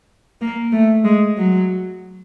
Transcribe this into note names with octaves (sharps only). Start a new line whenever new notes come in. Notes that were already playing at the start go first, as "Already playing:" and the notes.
A#3
A3
G#3
F#3